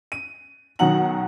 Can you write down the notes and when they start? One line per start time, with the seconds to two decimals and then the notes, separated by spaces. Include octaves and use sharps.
0.12 D#7
0.79 B1 D#3 F#3 F#5 A#5 F#7